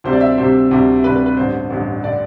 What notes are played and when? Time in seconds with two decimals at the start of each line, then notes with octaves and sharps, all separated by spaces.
0.04 D2 C3 G3 C5
0.13 D5
0.21 E5
0.38 D2 C3 G3 C5
0.71 D2 C3 G3
1.04 D2 C3 G3 B4
1.16 B4
1.26 B4
1.37 A1 G2 D3 C5
1.70 A1 G2 D3
2.04 D3 D5